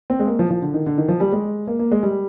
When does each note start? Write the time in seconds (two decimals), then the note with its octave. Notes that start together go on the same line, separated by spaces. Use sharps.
0.10 C4
0.20 G#3
0.27 A#3
0.39 F3
0.50 F3
0.62 D3
0.74 D#3
0.86 D3
0.98 D#3
1.09 F3
1.20 G3
1.32 G#3
1.67 A#3
1.79 A#3
1.91 G#3
2.03 G3